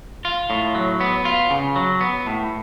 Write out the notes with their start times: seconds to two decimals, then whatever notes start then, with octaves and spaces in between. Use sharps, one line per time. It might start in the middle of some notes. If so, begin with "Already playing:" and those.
0.25 F4
0.50 A2
0.75 F#3
1.01 B3
1.25 F4
1.50 C#3
1.76 F#3
2.01 B3
2.26 A2